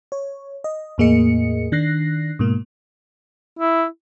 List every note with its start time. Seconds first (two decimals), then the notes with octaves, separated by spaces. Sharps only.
0.12 C#5
0.64 D#5
0.98 E2 A2 A#3 G#4 D#5 C#7
1.72 D#3 D4 F#6 A#6 C7
2.39 G#2 B2 A#3
3.59 E4